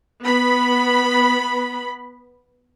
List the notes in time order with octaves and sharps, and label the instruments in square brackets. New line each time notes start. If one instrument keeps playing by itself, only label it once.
[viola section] B3 B5